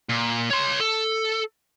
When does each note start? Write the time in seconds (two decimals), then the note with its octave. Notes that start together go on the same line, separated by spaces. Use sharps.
0.09 A#2
0.51 C#5 C6
0.80 A4